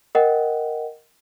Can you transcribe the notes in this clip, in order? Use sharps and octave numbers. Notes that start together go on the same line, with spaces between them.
A#4 D#5 F#5 G5